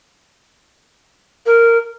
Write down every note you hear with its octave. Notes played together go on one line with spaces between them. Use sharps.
A#4